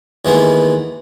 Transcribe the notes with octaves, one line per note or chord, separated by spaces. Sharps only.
D#2 E3 G#3 B3